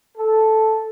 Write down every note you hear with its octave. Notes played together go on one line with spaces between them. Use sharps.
A4